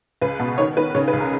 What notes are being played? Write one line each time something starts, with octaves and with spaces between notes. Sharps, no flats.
C#2 B4
B2
D#3 C#5
D#3 B4
C#3 C#5
B4
C#2
A#4